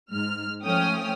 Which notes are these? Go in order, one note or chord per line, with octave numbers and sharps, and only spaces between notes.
G#2 F6
F3 A3 C#4 G5 D#6 F6